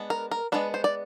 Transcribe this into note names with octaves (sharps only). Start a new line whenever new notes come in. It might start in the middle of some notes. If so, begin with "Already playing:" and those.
Already playing: G#3 B3 D4
A#4
A#4
G#3 B3 D4 B4
C5
D5